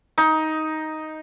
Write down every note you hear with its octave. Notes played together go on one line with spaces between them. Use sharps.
D#4